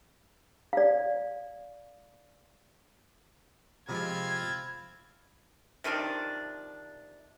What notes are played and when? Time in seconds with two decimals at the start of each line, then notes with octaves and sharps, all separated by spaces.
0.73 D5 F5
3.89 C3 F3 G#3 C4 F4 B5 G#6
5.84 C3 D#3 F3 D4